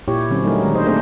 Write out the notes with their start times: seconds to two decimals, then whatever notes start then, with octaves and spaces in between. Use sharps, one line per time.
0.08 A#2 E4 G4 C#5
0.30 D3 F#3 C4 C#4
0.43 F#3 G3 A3 D#4 A#4
0.61 D#3 G#3
0.75 D4 C5 D#5
0.86 A3 A#3 C4 D4 G#4 C5